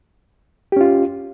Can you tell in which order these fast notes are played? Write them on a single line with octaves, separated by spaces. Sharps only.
G4 C#4 F4